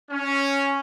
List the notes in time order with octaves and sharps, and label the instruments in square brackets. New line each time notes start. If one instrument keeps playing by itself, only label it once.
[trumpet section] C#4